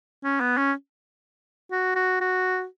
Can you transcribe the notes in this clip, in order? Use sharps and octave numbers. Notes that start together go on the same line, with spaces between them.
C#4
B3
C#4
F#4
F#4
F#4